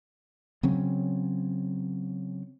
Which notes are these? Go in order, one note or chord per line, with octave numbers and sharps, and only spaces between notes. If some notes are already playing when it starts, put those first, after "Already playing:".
C#3 F#3 C4 C#4